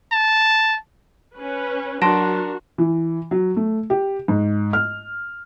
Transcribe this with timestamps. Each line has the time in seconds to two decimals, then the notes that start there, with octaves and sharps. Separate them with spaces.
0.12 A5
1.36 C#4 B4
2.02 F#3 D4 F#4 A#4 A5 C6 A#6 D7
2.78 E3
3.31 F#3
3.57 A3
3.90 G4
4.28 G#2
4.73 F6